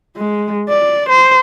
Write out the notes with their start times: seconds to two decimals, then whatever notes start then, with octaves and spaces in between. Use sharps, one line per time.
0.16 G#3
0.69 D5
1.09 C5